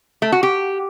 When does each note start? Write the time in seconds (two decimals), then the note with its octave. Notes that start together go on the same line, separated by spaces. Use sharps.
0.22 A3
0.32 F#4
0.43 G4